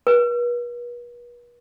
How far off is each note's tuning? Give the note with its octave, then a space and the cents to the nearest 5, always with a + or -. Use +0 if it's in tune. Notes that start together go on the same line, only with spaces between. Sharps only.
B4 -40